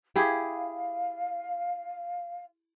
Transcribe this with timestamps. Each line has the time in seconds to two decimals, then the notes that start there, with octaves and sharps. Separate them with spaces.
0.16 E4 G4 G#4 F5